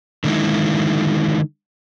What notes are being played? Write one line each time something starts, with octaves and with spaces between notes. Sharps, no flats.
D3 D#3 F#3 G#3 D#4 E4